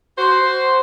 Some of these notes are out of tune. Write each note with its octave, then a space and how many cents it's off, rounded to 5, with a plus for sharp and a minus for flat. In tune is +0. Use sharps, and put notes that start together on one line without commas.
F#4 +20 C5 +0